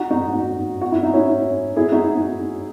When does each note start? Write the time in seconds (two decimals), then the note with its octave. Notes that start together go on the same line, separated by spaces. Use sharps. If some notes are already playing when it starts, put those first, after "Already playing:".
Already playing: D#4 F#4
0.11 D#4 F#4
0.81 F#4
0.92 E4
1.03 D#4
1.13 C#4 E4
1.76 E4 G#4
1.92 D#4 F#4